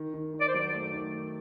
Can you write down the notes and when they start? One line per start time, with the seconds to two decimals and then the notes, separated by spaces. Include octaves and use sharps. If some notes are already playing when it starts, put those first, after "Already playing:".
Already playing: D#3
0.14 D#3
0.34 D#3
0.41 D5
0.48 C5
0.54 F#3 D5
0.74 A3
0.94 D#3